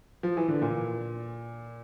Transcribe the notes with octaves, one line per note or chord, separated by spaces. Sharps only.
F3
E3
D3
A#2